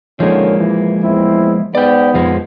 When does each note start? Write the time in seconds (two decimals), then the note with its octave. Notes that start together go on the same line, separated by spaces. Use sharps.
0.20 D3 D#3 F3 G#3 A#3 C#4
0.59 E3
1.03 E2 C4 E4
1.75 G#2 B3 D5 G5
2.14 F2 F3 G#3